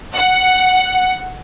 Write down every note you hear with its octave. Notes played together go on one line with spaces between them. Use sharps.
F#5